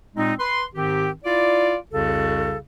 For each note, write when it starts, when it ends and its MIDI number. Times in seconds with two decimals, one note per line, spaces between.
0.16 0.33 46
0.16 0.33 56
0.16 0.33 60
0.16 0.33 63
0.39 0.63 71
0.39 0.63 84
0.75 1.10 44
0.75 1.10 51
0.75 1.10 60
0.75 1.10 67
1.24 1.75 64
1.24 1.75 65
1.24 1.75 74
1.91 2.56 36
1.91 2.56 41
1.91 2.56 49
1.91 2.56 66
1.91 2.56 69